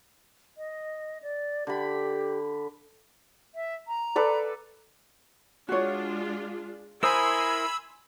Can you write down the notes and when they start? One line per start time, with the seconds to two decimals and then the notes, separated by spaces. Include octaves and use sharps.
0.58 D#5
1.22 D5
1.67 D3 G4 B5
3.55 E5
3.88 A#5
4.16 A4 B4 D5
5.69 G#3 D4 F4 F#4 C#5
7.03 E4 A#4 C5 G#5 B5 C6 D#6 E6